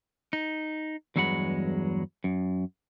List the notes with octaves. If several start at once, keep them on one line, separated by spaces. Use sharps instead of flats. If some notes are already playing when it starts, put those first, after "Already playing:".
D#4
E2 G2 F#3 G#3 F#5 B5
F#2